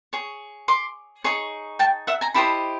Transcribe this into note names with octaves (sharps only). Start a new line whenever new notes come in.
G#4 C#5
C6 D6
D#4 G#4 C#5 C#6
G5 A5
E5 F#5
G#5 A#5
E4 G4 C5 D#5 A5 B5